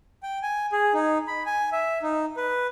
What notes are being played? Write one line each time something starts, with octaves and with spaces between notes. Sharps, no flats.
G5
G#5
G#4
D#4
B5
G#5
E5
D#4
B4